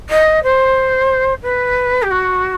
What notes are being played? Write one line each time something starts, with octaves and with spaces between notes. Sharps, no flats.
D#5
C5
B4
G4
F#4